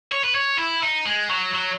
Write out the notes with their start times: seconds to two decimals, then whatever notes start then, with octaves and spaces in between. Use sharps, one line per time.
0.12 C#5
0.24 B4
0.35 C#5
0.58 E4
0.83 D#4
1.05 G#3
1.29 F#3
1.53 F#3